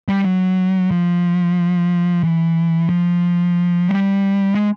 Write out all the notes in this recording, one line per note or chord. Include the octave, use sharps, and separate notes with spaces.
G3
F#3
F3
E3
F3
G3
G#3